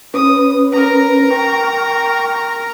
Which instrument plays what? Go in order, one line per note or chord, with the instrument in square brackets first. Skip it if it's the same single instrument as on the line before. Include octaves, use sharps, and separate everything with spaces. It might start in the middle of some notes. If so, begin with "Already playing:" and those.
[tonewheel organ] C#4 B4 [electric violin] D#6
[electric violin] A#4 A#5
[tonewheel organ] G5 C#6